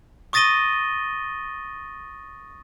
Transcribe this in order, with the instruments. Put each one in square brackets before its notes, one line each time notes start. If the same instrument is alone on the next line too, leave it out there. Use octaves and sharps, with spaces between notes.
[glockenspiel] C#6 D#6 A6 A#6 D#7 G7